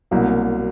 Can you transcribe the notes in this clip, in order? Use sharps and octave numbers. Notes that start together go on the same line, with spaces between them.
C2 B2 F#3 A#3